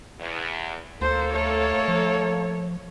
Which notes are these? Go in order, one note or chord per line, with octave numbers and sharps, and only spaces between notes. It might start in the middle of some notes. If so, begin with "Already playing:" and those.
E2
D2 A#3 A4 C5
A3 C#5
F3